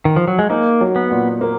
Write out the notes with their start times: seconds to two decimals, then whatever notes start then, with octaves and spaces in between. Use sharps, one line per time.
0.05 D#3
0.16 F3
0.28 F#3
0.39 G#3
0.50 A#3 D#4
0.81 F#3
0.96 B3
1.11 A#2
1.41 A#3